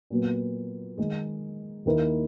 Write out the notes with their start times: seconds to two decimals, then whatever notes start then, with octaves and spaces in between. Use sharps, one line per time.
0.10 A#2 F#3 B3
0.98 D#3 G#3 D#4 G#4
1.85 D#2 D#3 A#3 E4 A#4